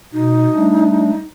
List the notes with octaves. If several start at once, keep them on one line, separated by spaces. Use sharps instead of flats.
B2 D#4
G3 A3 D4